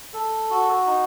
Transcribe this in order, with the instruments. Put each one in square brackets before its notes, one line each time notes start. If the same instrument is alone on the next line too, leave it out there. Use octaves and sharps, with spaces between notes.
[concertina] A4
F#4
D#4